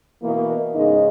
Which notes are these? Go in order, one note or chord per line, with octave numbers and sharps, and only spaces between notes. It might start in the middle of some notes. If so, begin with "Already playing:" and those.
B2 E3 A#3
G#2 C#3 D#4 D#5